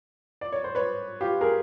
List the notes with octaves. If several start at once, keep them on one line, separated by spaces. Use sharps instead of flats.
D5
C#5
C5
B4 C#5
F4 G4
G#4 A#4